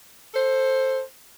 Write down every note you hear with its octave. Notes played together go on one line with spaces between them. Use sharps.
A4 C5